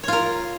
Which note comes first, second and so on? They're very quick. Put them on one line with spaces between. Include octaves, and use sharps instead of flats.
C#5 F4 A#4